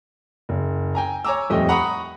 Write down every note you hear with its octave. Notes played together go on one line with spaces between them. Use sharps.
F#1
G5 G#5 A#5
C#5 G#5 A#5 D6 E6
D#1 F2 G3 A3 D#5 G5
F#5 A#5 B5 C#6 D#6